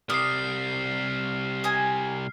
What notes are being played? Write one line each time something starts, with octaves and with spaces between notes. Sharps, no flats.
C3 G3 D6 D#6 F6 C7
D#5 G#5